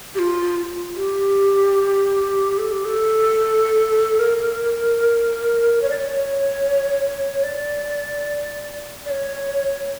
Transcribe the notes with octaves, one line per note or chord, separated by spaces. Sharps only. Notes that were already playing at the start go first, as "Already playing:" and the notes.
G4
F4
G4
A4
G4
A4
A#4
C#5
D5
C#5
D5
D5
C#5